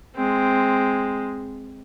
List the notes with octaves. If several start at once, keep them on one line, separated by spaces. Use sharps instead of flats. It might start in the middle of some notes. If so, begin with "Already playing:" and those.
G#3 C4